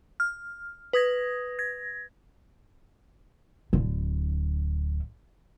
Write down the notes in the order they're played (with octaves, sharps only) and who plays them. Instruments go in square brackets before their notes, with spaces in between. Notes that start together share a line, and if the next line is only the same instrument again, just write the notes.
[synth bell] F6
B4 D#6 G#6 A#6
G#6 A#6
[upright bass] D1 D3